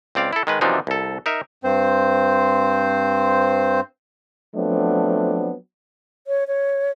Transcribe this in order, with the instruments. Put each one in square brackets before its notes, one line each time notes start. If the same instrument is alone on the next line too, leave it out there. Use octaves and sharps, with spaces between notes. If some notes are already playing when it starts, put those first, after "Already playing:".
[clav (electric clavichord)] C#2 C4 D5 F5
E4 A4
D#3 G#3 B4
F#2 C3 E3 F3 D4 D#4
C2 A4
D#4 A#4 E5
[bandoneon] G2 C4 C5
[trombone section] F3 F#3 A3 B3 C4 D4
[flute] C#5
C#5